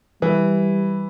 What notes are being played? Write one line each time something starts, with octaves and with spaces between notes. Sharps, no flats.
E3 G3